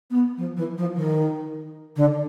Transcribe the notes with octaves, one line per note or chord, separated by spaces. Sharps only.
B3
F3
E3
F3
D#3
D3